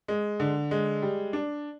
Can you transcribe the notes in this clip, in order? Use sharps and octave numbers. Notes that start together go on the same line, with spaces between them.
G#3
D3
G#3
G3
D4